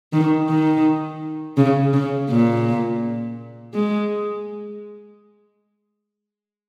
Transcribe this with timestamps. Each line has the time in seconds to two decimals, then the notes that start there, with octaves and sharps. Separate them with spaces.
0.13 D#3
0.49 D#3
1.57 C#3
1.93 C#3
2.30 A#2
3.74 G#3